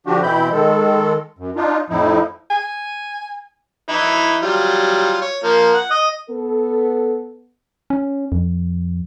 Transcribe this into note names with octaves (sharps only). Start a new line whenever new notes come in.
D3 F3 D4 F#4 G4
B2 E3 C4 E4 B5 G6
D#3 G#3 A4
F#2
D4 D#4 F4
F2 A2 F3 D#4 E4
G#5
E3 D#4 E4
F#3 G3 F4
C#5
F3 A#3
F#5
D#5 D#6
B3 A4
C#4
F2